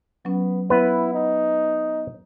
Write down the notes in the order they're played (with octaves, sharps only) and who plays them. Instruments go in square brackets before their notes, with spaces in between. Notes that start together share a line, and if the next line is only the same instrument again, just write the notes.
[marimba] F#3 C#4 [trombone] B3
[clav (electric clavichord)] B3 B4 [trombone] E4
[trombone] D#4